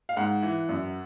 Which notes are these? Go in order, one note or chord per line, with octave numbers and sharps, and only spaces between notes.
F5
G#2 F#5
E3
F#2